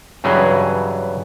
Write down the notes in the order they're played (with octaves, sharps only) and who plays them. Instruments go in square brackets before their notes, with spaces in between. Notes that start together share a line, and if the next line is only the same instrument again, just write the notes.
[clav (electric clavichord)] G2 C#3 E3 F#3 G#4